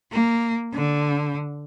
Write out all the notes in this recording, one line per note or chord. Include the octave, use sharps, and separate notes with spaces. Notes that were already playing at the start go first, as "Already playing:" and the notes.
A#3
D3